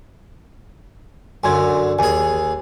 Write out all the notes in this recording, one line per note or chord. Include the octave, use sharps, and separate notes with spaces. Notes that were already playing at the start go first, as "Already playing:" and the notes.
F#2 D3 G#5 C6 G#6
D#2 G#4 G#5